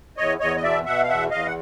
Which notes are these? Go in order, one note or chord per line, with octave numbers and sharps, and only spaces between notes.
E2 C#5 D#5
E2 C#5 D#5
D#5
B2 D5 E5
B2 E5 F#5
F5
E2 E5 F#5
E2 D#5 F5
F#5